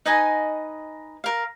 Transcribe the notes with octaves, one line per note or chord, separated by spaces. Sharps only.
D#4 B4 D#5 G#5
A#4 F5